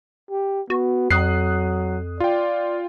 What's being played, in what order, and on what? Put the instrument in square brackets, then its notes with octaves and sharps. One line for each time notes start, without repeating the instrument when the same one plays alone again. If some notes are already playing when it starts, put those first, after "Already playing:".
[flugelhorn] G4
[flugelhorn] B3 [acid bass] F#4
[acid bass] F2 [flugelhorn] F#3 [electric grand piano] D#6 F#6 C7
[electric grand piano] F4 G5 [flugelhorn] D5